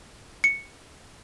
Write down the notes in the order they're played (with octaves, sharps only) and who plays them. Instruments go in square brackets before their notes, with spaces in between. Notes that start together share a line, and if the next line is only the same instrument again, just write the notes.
[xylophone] C#7